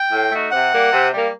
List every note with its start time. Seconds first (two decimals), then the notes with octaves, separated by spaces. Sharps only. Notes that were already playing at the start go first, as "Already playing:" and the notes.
Already playing: G5
0.12 A2
0.32 A3 D#4 F#4
0.51 C3 F#5
0.72 G3 A#3
0.93 C3
1.13 G3 A#3